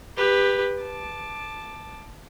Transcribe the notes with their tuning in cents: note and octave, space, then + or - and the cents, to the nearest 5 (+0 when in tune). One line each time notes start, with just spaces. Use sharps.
G4 +20 B4 +0
A5 -5 D6 +15